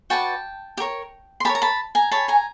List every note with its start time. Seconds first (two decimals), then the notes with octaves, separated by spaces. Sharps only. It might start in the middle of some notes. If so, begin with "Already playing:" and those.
0.10 F#4 B4 D5 G5 A5
0.77 G4
0.80 A#4 C#5
1.40 C6
1.45 G4 A#4 C#5 A5 B5
1.55 A#5
1.62 A5 B5
1.95 G#5 A#5
2.11 G#4 C#5 A5 B5
2.28 G#5 A#5